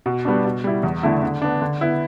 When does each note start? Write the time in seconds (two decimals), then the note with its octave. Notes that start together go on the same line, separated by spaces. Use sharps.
0.06 B2
0.25 G3 B3 D4
0.45 B2
0.64 G3 E4
0.83 E2
1.03 D3 A3 E4
1.23 D3
1.42 B3 D4
1.62 D3
1.81 B3 E4